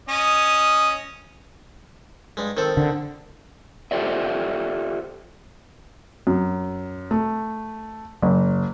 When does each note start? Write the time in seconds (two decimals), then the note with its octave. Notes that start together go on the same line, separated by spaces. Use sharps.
0.09 C#4 D#5
2.37 G2 G#3
2.57 D#3 C4 A4
2.77 D3
3.91 F4 G4 A4 C5 D5 E5
6.27 F#2
7.11 A3
8.22 F#1